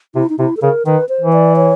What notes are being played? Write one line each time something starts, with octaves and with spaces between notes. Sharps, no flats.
C3 E4
D#4
C3 E4
A4
C#3 A#4
D#3 B4
C5
E3
D5
C#5